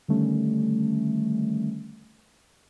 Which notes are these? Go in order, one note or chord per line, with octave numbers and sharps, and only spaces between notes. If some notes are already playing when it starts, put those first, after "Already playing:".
D3 D#3 G3 A3 C#4